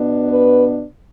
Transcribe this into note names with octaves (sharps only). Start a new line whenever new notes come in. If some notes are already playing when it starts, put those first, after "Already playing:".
Already playing: B2 B3 D4
B4